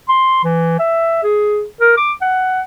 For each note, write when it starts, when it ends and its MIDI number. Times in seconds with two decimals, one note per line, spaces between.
0.09 0.43 84
0.44 0.76 52
0.79 1.21 76
1.24 1.63 68
1.80 1.94 70
1.97 2.13 86
2.21 2.61 78